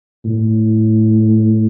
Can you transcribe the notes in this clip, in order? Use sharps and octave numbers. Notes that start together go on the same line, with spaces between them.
A2